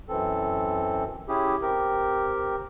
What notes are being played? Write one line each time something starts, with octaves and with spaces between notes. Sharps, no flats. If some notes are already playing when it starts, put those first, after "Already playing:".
F#2 E3 C4 A4
C#4 E4 G4 G#4
C4 G4 A#4